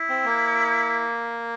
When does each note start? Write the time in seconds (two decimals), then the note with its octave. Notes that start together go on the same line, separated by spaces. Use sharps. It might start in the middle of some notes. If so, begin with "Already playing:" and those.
Already playing: E4
0.09 C4
0.25 A#3